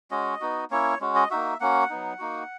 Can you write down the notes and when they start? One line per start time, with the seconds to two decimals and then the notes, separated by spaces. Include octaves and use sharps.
0.11 G#3 C#4 F#4 D#5
0.41 B3 D#4 F#4
0.71 A#3 C#4 E4 C#5
1.01 G#3 C#4 F#4
1.15 D#5
1.30 A#3 D#4 F#4 E5
1.60 A#3 C#4 F#4 F#5
1.90 F#3 B3 D#4
2.19 A#3 D#4 F#4